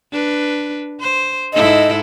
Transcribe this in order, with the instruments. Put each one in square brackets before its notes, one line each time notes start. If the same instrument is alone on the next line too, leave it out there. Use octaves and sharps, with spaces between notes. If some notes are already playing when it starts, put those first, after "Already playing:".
[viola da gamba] D4 B4
C5
[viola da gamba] G#2 E4 A4 [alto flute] D#5